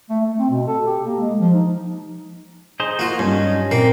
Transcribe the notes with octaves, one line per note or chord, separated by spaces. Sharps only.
A3
A3
C4
B2
A4
G4
A#3
G#3
F3
D#4
D#4 G#4 C5
A#3 F4 F#4
G2 C#4 D#4
A#2 A#3 C4